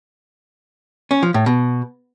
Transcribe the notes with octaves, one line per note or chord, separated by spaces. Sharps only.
C#4
F3
A2
B2